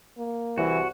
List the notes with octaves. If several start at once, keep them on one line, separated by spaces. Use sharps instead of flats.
A#3
C2 E3 F#4